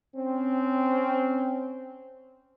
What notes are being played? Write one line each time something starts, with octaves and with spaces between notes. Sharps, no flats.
C4 C#4